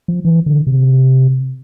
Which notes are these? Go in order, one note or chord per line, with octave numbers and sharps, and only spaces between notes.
F3
E3
D3
C3